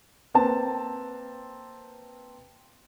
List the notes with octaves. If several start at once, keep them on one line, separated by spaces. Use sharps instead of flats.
A#3 C4 B4 A5